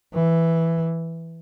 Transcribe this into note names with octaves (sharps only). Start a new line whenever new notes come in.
E3